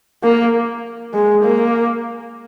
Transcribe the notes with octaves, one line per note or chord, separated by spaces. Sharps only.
A#3
G#3
A#3